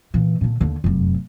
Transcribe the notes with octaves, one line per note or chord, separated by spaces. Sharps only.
A#2 E3
A#2 D3
D#2 D3
F1 F#2